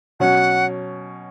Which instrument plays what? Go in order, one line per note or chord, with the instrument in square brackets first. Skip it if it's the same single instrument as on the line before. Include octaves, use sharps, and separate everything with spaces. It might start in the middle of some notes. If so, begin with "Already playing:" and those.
[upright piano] B2 F#3 C#4 [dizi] F#5